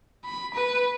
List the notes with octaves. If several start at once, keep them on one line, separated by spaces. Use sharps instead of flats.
B5
B4